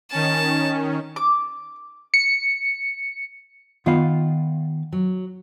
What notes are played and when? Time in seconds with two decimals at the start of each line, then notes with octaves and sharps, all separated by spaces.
0.12 D#3 C#4 A5
1.16 D6
2.14 C#7
3.86 D#3 B3 F4 F5
4.92 F#3